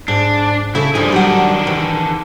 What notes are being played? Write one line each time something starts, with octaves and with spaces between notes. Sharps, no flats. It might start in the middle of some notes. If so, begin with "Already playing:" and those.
G#2 D4
C#3 E4 A4
G2 F3 G3 G#4
D#3 F#3 G3 D4 F#5
E3